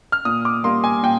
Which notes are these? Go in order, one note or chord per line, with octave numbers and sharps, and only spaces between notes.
F6
A#2 D#6
D6
G3 A#3 C6
G#5
A#2 G5